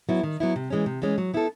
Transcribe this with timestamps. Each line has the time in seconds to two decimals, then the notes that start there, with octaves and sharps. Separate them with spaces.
0.09 F#3 B3 E4
0.23 D#3
0.40 F#3 B3 E4
0.56 C3
0.70 E3 G#3 C#4
0.86 C3
1.02 E3 G#3 C#4
1.18 F#3
1.34 B3 E4 A4